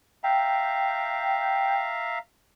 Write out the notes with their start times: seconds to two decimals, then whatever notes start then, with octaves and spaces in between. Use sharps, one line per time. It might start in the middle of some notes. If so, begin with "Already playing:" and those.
0.24 E5 F5 G5 A#5